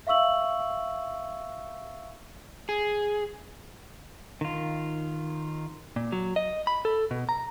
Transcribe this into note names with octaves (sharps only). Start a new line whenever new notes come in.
E5 F5 C#6 E6 F#7
G#4
D#3 F4
A#2
F#3
D#5
B5
A4
B2
A#5